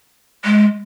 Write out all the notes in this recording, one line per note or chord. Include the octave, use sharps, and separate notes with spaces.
G#3